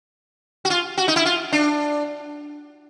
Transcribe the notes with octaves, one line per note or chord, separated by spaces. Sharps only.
F#4
F4
F#4
D#4
E4
F4
D4